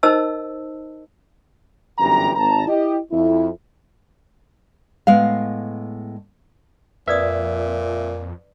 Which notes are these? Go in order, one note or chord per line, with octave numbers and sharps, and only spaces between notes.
D#4 A#4 C5 D#5 A5 E6
G1 F#2 E3 G4 A#5
G#1 A5 A#5
E4 G4 D#5
F2 E4
A2 G#3 B3 F5
F2 A#2 B4 D5 E5 D#6